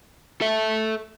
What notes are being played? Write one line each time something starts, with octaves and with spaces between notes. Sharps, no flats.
A4 E5